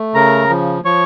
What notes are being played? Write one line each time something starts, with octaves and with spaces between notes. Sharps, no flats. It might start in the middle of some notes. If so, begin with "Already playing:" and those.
Already playing: A3
C#3 A#4 A#5
F3
F3 C#5 C#6